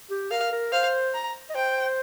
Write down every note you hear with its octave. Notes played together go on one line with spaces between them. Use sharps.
G4
A#4 F5
A#4
C5 F5
A#5
D#5
C5 G5